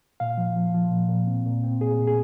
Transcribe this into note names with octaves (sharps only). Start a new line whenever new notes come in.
A#2 F5
F3
F3
F3
A#2
A#2
C4
A#2
C4
A#2 G#4
A#2
G#4